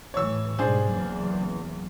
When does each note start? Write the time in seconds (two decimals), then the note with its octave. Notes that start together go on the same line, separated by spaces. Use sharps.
0.14 A2 E3 C#5 E6
0.59 G#2 B2 G3 D4 G#4 C5
0.90 F#1 E2 E3